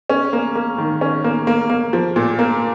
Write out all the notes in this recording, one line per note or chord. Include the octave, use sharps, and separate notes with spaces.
C#4
A#3
A#3
D#3
C#4
A#3
A#3
A#3
F3
A#2
A#3